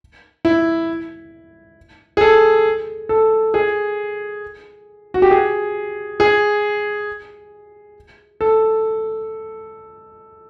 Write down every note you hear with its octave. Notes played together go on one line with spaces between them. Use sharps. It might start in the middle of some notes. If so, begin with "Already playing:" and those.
E4
G#4
A4
A4
G#4
F#4
G4
G#4
G#4
A4